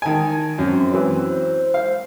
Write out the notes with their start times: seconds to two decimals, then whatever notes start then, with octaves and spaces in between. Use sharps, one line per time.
0.02 D#3 G#5 A5
0.58 F#2 C4
0.92 E3 F#3
1.28 C5
1.74 F5